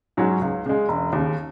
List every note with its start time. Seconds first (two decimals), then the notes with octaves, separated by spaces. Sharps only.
0.17 G#2 F#3 C#4 F#4
0.41 C#2
0.66 C#3 G#3
0.88 E1
1.13 D#2 C#3